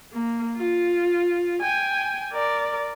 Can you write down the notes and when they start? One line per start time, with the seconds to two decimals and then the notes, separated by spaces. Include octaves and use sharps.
0.13 A#3
0.56 F4
1.61 G5 G#5
2.33 A#4 D5